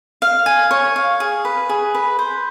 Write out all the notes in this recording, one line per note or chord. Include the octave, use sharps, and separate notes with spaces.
F5
G#5
C#5
F5
G#4
B4
G#4
B4
C5